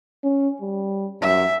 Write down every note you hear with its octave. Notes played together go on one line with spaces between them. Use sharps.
C#4
G3
F#2 E5